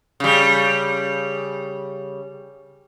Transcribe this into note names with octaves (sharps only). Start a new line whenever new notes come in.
C#3 G3